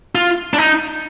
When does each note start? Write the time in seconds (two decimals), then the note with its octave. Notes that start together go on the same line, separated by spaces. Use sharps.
0.15 F4
0.54 D4
0.58 D#4